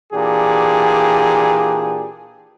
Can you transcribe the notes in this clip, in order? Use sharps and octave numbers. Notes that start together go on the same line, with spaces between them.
A#2 E3 D4 G4 G#4